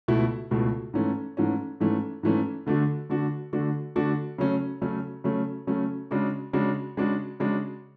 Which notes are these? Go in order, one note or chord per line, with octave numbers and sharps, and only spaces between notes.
C#2 B2 A3 E4
C#2 B2 A3 E4
G#2 E3 A3 C#4
G#2 E3 A3 C#4
G#2 E3 A3 C#4
G#2 E3 A3 C#4
D3 A3 D4 F#4
D3 A3 D4 F#4
D3 A3 D4 F#4
D3 A3 D4 F#4
C#3 F#3 A3 C#4
C#3 F#3 A3 C#4
C#3 F#3 A3 C#4
C#3 F#3 A3 C#4
C#3 G#3 D4 F#4
C#3 G#3 D4 F#4
C#3 G#3 D4 F#4
C#3 G#3 D4 F#4